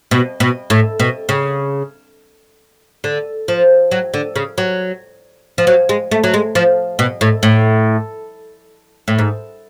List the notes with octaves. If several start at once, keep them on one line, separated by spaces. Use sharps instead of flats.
B2
B2
A2
B2
C#3
D3
F3
F#3
D3
C#3
F#3
F3
F#3
G#3
A3
F#3
G#3
F3
B2
A2
A2
A2
G#2